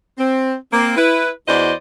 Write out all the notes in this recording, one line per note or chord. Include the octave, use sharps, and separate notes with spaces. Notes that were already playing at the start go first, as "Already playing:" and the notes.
C4
A#3 C4
E4 B4
E2 E4 F#4 C5 D5 D#5